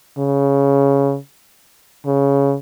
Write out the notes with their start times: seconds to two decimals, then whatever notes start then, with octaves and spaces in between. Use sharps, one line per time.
0.18 C#3
2.06 C#3